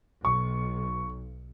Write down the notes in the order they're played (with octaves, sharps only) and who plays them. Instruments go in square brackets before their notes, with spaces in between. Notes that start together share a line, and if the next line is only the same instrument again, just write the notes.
[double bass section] B1 [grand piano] C#6